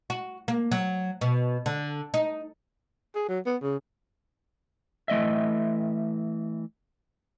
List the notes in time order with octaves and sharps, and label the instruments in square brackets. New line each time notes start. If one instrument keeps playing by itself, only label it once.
[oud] F#4
A#3
F#3
B2
D3
D#4
[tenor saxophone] G#4
F#3
B3
C#3
[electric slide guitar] E3 A3 D#5 E5